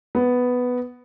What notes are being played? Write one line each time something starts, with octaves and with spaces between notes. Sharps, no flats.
B3